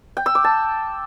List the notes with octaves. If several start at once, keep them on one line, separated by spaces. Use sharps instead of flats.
G5
E6
D6
A5